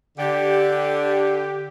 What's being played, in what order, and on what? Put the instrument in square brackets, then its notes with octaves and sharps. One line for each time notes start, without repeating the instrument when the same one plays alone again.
[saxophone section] D3 [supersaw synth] G4